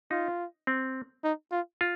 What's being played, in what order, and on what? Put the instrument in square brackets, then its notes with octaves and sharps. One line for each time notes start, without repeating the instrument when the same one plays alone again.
[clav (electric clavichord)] D#4 [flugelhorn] F4
[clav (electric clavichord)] C4
[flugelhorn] D#4
F4
[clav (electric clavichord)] F4